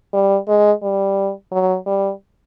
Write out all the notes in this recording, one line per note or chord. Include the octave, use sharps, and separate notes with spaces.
G3
G#3
G3
F#3
G3